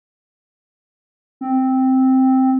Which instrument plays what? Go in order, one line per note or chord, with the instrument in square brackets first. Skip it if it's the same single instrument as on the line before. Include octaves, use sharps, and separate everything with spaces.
[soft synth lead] C4